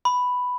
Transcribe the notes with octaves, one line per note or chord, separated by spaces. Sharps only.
B5